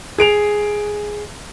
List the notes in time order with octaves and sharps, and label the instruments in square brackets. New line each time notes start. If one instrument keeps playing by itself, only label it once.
[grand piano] G#4 D7 F7